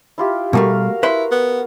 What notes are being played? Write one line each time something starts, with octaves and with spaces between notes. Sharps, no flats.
E4 F4 G4
B2 G3 A3 F#4 A#4 F5
E4 B4 C6
B3